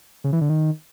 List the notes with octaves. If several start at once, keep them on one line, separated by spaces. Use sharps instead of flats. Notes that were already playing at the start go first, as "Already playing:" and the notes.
C#3
E3
D3
D#3